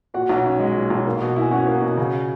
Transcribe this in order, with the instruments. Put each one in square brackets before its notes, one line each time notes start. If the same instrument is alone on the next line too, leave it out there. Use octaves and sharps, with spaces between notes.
[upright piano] A#2 [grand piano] F#4 F#5
[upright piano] B1
C#4
G#3
A#2
B1
A#3
B2
E4
[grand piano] G#5
[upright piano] C#4 [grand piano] F#4 F#5
[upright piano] A#3
B2
C#3